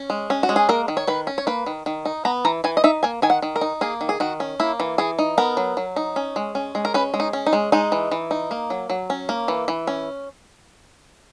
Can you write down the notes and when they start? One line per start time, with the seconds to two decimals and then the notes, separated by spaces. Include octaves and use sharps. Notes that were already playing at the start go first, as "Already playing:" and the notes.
Already playing: C#4
0.10 G#3
0.30 C#4
0.43 F#4
0.49 G#3
0.56 G#4
0.69 A#3 A#4
0.88 D#3
0.97 C#5
1.07 D#3 B4
1.27 C#4
1.38 C#5
1.47 A#3 B4
1.66 D#3
1.86 D#3
2.05 D#4
2.25 B3 A#5
2.45 E3 A#5
2.64 E3 G#5
2.77 D#5
2.84 D#4 E5
3.03 A#3 G#5
3.22 D#3 G#5
3.30 F#5
3.42 D#3
3.56 A#4
3.61 D#4
3.81 A#3 G#4
4.01 D#3
4.09 G#4
4.20 D#3 F#4
4.40 C#4
4.60 A#3 E4
4.80 E3
4.98 E3 G#4
5.19 D#4
5.38 B3 A#4
5.57 F#3
5.77 F#3
5.96 D#4
6.16 C#4
6.36 G#3
6.55 C#4
6.75 G#3
6.85 A#4
6.94 C#4 B4
7.14 G#3
7.20 D#4
7.33 C#4
7.47 D#4
7.53 G#3
7.72 G#3 D#4
7.92 E3
8.12 E3
8.31 D#4
8.51 A#3
8.70 F#3
8.90 F#3
9.10 C#4
9.29 A#3
9.48 E3
9.68 E3
9.87 C#4